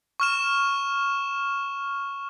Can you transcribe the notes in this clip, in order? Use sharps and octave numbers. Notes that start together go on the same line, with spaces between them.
C#6 F6 E7